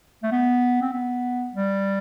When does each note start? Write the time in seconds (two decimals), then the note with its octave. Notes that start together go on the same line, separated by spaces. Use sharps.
0.23 A3
0.31 B3
0.82 C4
0.93 B3
1.53 G3